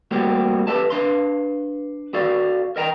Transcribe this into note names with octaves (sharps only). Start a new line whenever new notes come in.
G3 A3 A#3 C4 F#4 G4
G4 A4 B4 E5 A5
D4 B4 F5 C6
F#4 A4 D5 F5
A#4 D#5 G5 A#5